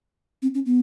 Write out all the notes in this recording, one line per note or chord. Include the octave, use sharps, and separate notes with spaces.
C4
C#4
B3